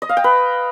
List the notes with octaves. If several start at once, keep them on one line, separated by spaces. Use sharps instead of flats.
D#5
F5
G5
B4